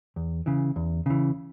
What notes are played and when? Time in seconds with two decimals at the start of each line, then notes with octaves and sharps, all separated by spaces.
0.16 E2
0.46 C#3 E3
0.76 E2
1.06 C#3 E3